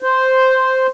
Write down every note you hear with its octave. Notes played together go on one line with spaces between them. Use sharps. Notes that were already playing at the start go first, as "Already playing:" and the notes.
C5